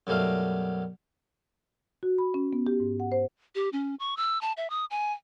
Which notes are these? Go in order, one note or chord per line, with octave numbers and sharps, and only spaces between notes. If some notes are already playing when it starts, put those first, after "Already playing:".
F#2 B2 G3 A3 F5
F#4
B5
C#4
B3
G4
G#2
F#5
C5
G4
C#4
C#6
E6
A5
E5
D#6
G#5